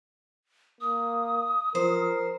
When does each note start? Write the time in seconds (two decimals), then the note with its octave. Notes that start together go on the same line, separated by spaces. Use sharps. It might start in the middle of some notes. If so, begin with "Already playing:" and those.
0.81 A#3 D#6
1.75 F3 A#4 C5